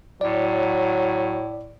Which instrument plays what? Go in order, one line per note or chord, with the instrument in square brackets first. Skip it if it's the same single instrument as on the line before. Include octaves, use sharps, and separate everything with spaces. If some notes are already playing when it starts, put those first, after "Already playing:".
[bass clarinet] A2 [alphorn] F#3 [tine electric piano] D5